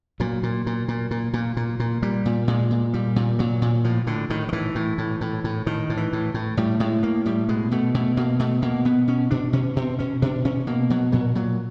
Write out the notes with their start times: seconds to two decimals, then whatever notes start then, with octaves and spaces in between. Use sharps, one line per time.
0.20 A#2 F#3
0.43 A#2
0.66 A#2
0.88 A#2
1.11 A#2
1.34 A#2
1.57 A#2
1.80 A#2
2.02 A#2 G3
2.26 A#2
2.48 A#2 G#3
2.71 A#2
2.93 A#2 G3
3.16 A#2
3.39 A#2 F#3
3.62 A#2
3.84 A2 F3
4.07 A2 D3
4.30 A2 D#3
4.49 D#3
4.53 A2 E3
4.75 A2
4.98 A2
5.21 A2
5.44 A2
5.66 A2 D#3
5.90 A2
5.97 E3
6.13 A2
6.34 A2
6.57 A2 G3
6.80 A2 G#3
7.03 A2 A#3
7.26 A2 G3
7.49 B2 G#3
7.71 B2 A3
7.94 B2 A3
8.17 B2 A#3
8.39 B2 A3
8.62 B2 A#3
8.85 B2 B3
9.08 B2 C#4
9.31 B2 D4
9.53 B2 C#4
9.76 B2 C4
9.99 B2 C#4
10.22 B2 D4
10.45 B2 C#4
10.67 B2 A#3
10.90 B2 F#3
11.12 A#2 F#3
11.35 A#2 F#3